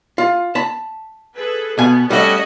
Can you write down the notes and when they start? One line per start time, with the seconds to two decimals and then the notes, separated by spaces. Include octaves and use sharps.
0.18 F4
0.55 A5 B5
1.34 G#4 A4 B4
1.78 B2 B3 G#5
2.10 G3 A3 C#4 F#4 D#5